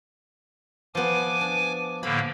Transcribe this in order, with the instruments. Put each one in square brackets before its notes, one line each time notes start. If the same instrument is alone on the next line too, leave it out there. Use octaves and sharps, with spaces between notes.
[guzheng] F3 B3 [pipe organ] G#5 D6
[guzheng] D4
[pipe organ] A2 D3 A#3 [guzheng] B5